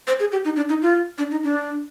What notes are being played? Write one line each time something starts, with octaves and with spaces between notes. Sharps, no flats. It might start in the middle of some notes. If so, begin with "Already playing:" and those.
C5
G#4
G4
D#4
D4
D#4
F4
D4
D#4
D4